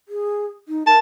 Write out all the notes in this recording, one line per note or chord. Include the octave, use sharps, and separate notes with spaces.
G#4
D#4
A#4 A5